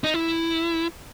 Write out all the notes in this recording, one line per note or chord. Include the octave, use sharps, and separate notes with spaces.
D#4
E4